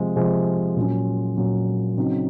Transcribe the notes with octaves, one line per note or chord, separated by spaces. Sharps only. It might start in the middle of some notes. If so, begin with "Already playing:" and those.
Already playing: C3 F3 G#3
C3 F3 G#3
A#2 F#3 C#4
A#2 F#3 C#4
C#3 F#3 C4 D#4